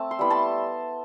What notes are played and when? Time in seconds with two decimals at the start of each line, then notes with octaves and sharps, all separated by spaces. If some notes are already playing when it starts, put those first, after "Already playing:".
Already playing: A3 C4 E5 A5
0.11 C6
0.19 G3 B3 E4 B5
0.30 A5 C6